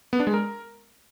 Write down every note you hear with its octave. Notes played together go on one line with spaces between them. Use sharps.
B3
D4
G#3
A#4